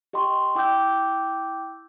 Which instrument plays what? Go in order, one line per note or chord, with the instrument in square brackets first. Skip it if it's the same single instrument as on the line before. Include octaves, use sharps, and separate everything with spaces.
[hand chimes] G4 D#5 G5 C6 C#6
E4 G5 D6 E6 G6